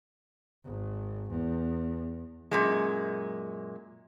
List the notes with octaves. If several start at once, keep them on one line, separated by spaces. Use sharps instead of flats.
G#1
E2
F#2 A#2 G#3